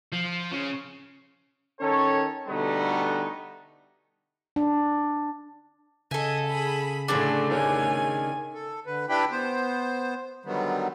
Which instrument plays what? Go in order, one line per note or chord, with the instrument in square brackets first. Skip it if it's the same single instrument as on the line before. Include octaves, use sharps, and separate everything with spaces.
[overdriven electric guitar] F3
C#3
[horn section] D#3 C#4 A4 C#5
B2 D3 G3 A3 B3 D#4
[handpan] D4
[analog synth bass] C#3 [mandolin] A4 G#5 [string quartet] D#5 E5
[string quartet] G#4 B5
[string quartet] A2 D3 A3 [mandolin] D4 G#4 D5
[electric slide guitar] D#4 A#4 C#5 [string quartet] G#5
[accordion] A4
D3 B4
D4 E4 G4 B4 G5 B5
B3 C5
D3 D#3 F#3 G3 B3